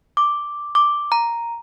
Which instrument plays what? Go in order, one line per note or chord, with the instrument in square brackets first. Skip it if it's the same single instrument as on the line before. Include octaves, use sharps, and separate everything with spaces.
[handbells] D6
D6
A#5